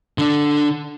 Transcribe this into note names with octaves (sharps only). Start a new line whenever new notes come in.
D3 D4